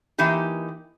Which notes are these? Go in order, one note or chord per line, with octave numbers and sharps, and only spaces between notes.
E3 A#3 D#4 G4